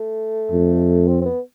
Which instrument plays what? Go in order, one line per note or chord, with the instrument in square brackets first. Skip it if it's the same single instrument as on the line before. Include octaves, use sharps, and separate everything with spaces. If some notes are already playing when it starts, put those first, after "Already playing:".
Already playing: [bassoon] A3
[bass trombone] F2
[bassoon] C4
C4
B3